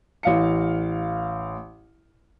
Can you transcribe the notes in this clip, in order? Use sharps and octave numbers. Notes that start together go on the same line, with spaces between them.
A1 F5 C#7